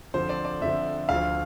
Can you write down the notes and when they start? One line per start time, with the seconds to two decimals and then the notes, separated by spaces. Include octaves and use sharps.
0.14 F2 D3 F3 C5
0.29 D5
0.45 D5
0.61 F2 D3 F3 E5
1.09 D2 D3 F3 F5